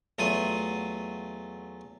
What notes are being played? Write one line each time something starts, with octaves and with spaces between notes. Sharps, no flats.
E2 F#3 A3 F4 D#6